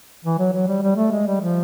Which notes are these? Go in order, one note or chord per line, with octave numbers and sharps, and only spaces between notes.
E3
F#3
F#3
G3
G3
A3
G#3
G3
F3